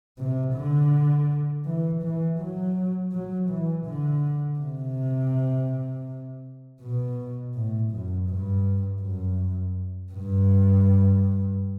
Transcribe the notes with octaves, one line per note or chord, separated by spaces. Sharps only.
C3
D3
E3
E3
F#3
F#3
E3
D3
C3
B2
A2
F#2
G2
F#2
G2